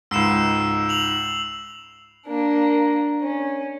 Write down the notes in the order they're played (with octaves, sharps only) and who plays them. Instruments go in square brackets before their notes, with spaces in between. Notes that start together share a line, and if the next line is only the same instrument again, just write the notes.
[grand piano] C#2 G#2 [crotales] E6 C7 E7
[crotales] F7 F#7
[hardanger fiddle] A#3 D4
C#4